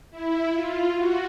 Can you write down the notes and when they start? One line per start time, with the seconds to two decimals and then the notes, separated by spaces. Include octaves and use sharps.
0.10 E4
0.52 F4
0.95 F#4